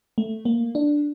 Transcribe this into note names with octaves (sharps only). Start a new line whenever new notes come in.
A3
A#3
D4